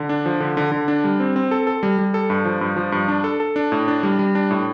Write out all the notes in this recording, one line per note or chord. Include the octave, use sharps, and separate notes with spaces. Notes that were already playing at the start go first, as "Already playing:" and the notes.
Already playing: D3
D4
F3
D3
D3
D3
D4
G3
C4
C4
A4
A4
G3
G3
A4
G2
F3
G2
F3
G2
D4
A4
A4
D4
A2
D4
G3
G3
D4
A2